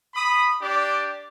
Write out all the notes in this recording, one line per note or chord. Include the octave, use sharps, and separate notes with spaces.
B5 D#6
D4 G4 D5